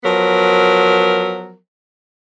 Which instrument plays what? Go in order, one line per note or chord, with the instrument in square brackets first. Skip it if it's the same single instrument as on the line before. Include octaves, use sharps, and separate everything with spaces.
[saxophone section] F3 F#3 B3 A#4